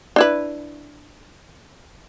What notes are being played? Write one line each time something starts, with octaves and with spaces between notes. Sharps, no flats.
D4 E4 B4